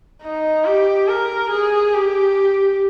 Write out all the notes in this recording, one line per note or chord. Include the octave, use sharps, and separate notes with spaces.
D#4
G4
A#4
G#4
G4